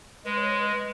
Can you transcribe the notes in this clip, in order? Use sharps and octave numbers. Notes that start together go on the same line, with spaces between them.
G#3 B4
C#5
B4
B4